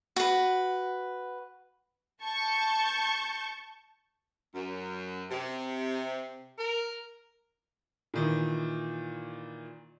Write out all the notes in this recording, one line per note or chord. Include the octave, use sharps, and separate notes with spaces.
F#4 B4
A5 C#6 G6
F#2
C3
A#4
A#2 D#3 E3